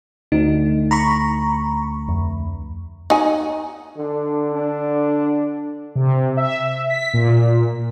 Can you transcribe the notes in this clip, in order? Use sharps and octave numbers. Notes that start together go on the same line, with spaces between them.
D2 D#4
A#5 B5 C#6
F2
D#4 G#5
D3 D4
D4
C3
E5
B6
A#2